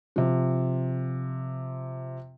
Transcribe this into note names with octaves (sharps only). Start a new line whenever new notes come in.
C3 F3